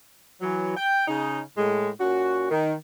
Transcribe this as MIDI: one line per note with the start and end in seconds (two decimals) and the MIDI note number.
0.41 0.75 52
0.41 0.75 54
0.76 1.04 79
1.07 1.40 49
1.07 1.40 63
1.57 1.90 45
1.57 1.90 56
2.00 2.50 46
2.00 2.50 61
2.00 2.50 66
2.51 2.74 51